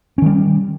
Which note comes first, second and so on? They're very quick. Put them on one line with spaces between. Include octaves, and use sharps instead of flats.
C#4 D#3 G3